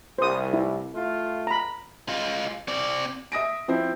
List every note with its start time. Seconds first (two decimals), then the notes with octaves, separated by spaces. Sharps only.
0.19 C2 C5 D#6
0.54 E4
0.94 A3 F4
1.47 A#5 B5
2.09 G#3 F4
2.68 C4 D5
3.32 E5 D#6 A#6 D7
3.68 F3 C4 E4